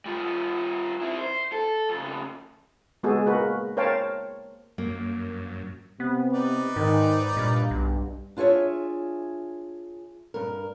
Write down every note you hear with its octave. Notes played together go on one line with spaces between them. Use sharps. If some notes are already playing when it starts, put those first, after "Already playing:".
G3 F4
C4 E4
C5
A4
F2 C#3
G#3 B3 F#4 G#4 A4
A#3 F#4 A#4 B4
A#4 C5 C#5 F5 G5 A5
F#2 A#3
C3 B3
D#4 B4 D5
G#2 D#3
G2 A#2
B1
D4 F4 G#4 C#5 E5
G2 A#4